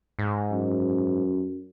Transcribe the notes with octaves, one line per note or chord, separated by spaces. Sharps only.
G#2
F#2